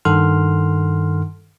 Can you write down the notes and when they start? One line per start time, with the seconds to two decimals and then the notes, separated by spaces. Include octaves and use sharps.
0.05 G2 D#3 A4 F#5 C6 F6